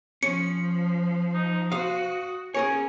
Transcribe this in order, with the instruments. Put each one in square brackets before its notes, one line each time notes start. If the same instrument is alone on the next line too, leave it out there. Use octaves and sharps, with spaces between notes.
[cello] F3 [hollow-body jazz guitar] C#4 [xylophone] C#7
[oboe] D#4
[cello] F#4 [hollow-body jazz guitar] C5 F5 [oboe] D#6
[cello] C#4 [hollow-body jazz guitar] G#4 A#4 C#5 [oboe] G#5